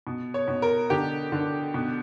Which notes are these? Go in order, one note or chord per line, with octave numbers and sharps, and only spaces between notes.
B2
C#5
B2
A#4
D3 G4
D3
B2